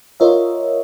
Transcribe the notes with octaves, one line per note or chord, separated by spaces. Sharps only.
F4 A#4 C#5 D#5 E5